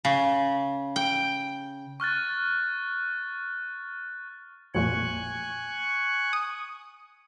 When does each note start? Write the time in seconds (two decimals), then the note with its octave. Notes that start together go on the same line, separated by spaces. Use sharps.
0.05 C#3
0.96 G5
2.00 C#6 F6 F#6 A6
4.75 A1 F2 A#2 G#5 C#6 F#6
6.33 D#6